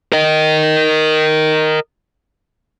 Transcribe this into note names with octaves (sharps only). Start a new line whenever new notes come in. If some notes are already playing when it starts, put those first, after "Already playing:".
A#4 D#5